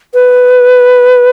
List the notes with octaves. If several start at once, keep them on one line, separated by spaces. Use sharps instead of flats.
B4